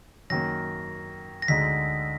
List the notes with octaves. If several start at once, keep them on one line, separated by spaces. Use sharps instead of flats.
F#2 D#3 A#3 A#6
A#6
D2 D3 G#3 D#4 B6